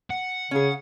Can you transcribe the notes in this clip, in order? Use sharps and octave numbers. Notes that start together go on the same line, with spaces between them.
F#5
C#3 C#4 G#4